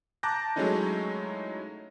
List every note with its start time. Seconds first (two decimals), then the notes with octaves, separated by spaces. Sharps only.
0.23 A5 A#5 D6 F#6 G6 A#6
0.56 F#3 G#3 A3 C#4 D#4 E4